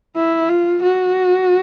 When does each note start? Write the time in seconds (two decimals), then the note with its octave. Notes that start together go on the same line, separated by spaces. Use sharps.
0.16 E4
0.49 F4
0.83 F#4